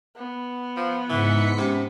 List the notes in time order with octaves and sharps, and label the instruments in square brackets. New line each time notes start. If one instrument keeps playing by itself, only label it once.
[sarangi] B3
[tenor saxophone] F3
[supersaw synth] G#2 B6 C#7 [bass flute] C#3 [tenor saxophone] E3
[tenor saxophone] C3 [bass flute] C#4